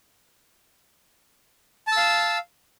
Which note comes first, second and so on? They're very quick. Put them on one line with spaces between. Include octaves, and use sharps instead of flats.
A5 E6 F5